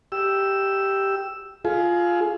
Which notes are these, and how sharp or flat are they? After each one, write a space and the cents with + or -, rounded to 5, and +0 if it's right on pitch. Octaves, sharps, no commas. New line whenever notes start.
G4 +0 E6 +5
F4 +0 G#4 +25